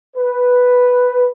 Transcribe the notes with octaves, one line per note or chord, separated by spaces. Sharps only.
B4